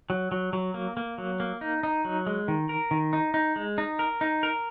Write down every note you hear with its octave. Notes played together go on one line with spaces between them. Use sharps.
F#3
F#3
F#3
A#3
A#3
F#3
A#3
D#4
D#4
F#3
G#3
D#3
A#4
D#3
D#4
D#4
G#3
D#4
A#4
D#4
A#4